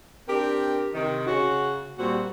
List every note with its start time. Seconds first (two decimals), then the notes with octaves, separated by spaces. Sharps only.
0.28 C4 D4 G4 A#4
0.94 C3 D#3
1.27 C#3 F#4
1.98 A#2 G3 C4 F#4